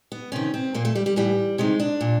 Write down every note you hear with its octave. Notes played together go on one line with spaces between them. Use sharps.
B3
C3 D#3 C#4
C4
A#2 A#3
A3
G3
G3
A2 E3 G3
C3 D#3 G#3
D4
A#2